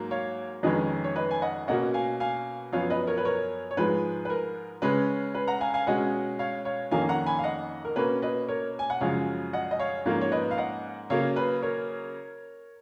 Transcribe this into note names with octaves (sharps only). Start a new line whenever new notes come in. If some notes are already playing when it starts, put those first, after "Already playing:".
Already playing: G#2 F#3 A#3
C#5 F5
F2 D#3 G#3 C#4 B4 D#5
C#5
B4 D#5
G#5
D#5 F#5
B2 A#3 C#4 D#5 F#5
F5 G#5
F5 G#5
F#2 F3 B3 C#5 F5
B4 D#5
A#4 C#5
B4
A#4 C#5
C#5
G#2 F3 G#3 B4
B4
A#4
C#3 G#3 C#4 B4
B4
F#5 A#5
F5 G#5
F5 G#5
B2 G#3 C#4 D#5 F#5
C#5 F5
C#5 F5
F2 D#3 A#3 C#4 F5 G#5
F#5 A#5
G#5 B5
F5
D#5 F#5
A#4
B2 A#3 C#4 B4
B4 D#5
A#4 C#5
G#5
F#5
F#2 C#3 F3 G#3 C#5 F5
D#5 F#5
D#5
C#5 F5
G#2 F3 A#3 C#4 C#5 F5
C#5
B4 D#5
F5
D#5 F#5
C#3 F#3 A#3 C#5 F5
B4
A#4 C#5